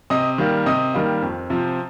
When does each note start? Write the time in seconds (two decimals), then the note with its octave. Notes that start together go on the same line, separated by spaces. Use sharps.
0.10 C3 D#5 D#6
0.38 D#3 G3 A#3
0.66 C3 D#5 D#6
0.94 D#3 G3 A#3
1.22 F2
1.50 C3 F3